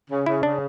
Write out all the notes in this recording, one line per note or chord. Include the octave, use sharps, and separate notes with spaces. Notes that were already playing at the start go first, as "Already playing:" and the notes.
C#3
C#3 E4
C#3 D4